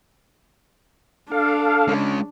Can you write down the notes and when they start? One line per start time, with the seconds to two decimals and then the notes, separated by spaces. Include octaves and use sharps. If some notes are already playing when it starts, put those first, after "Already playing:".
1.31 D4 A4 F5
1.88 G#3 C#4